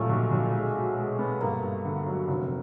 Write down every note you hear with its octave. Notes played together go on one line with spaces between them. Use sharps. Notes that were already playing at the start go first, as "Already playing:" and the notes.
Already playing: A#2 F#3 G3 A3 C#4
B1
B1
G#3
B2
G#3
B3
G2 A#3
G2
D3
F#3
F1